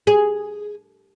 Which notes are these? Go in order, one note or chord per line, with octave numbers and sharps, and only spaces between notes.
G#4